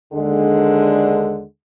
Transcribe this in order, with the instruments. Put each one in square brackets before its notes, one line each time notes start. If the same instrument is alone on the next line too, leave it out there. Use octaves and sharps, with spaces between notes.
[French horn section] D#2 D3 G#3